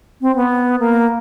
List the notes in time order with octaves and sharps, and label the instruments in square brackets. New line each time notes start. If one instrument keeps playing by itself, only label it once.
[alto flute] C4
B3
A#3